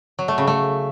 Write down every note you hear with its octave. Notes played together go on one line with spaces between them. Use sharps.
F#3
A3
C#3
A3